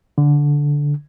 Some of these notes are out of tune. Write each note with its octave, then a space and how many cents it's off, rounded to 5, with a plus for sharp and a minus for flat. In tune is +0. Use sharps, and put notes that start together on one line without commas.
D3 -10